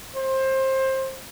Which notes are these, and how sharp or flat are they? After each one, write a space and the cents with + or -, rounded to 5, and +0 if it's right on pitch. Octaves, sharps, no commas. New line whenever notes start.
C5 +20